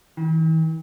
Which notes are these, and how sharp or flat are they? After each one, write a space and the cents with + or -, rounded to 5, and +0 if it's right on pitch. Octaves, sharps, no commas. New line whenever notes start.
E3 -45